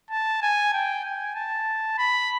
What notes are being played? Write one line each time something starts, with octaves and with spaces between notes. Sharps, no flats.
A5
G#5
G5
G#5
A5
B5